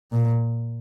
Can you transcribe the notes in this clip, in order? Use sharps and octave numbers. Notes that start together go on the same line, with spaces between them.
A#2